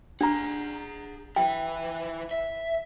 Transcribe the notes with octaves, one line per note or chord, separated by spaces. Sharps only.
D4 G#4 F#5 A#5
E4 B4 G5
E5